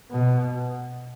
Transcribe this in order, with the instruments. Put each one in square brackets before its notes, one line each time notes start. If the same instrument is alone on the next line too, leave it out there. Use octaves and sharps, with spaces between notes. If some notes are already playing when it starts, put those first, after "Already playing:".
[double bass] B2